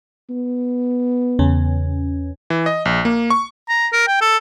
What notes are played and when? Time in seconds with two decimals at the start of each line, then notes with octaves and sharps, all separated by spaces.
0.30 B3
1.39 E2 C#3 C#4
2.50 E3
2.66 D#5
2.85 A#1
3.05 A#3
3.30 C#6
3.69 A#5
3.93 A#4
4.08 G5
4.21 A4